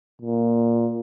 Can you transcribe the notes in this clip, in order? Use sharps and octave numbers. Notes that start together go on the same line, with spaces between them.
A#2